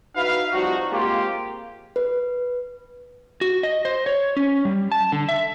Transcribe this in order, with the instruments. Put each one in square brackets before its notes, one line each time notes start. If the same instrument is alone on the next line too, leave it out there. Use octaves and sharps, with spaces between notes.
[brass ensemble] D#4 E4 F#4 B4 E5 F5
F3 G3 C4 D#4 F#4
G#3 A#3 C4 F4 G4
[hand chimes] B4
[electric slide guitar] F#4
D#5
C5
C#5
C#4
G3
A5
D3
E5